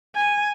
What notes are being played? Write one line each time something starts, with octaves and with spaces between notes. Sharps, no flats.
G#5